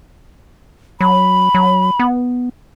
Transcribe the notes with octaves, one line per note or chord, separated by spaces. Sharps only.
F#3 B5
F#3
B3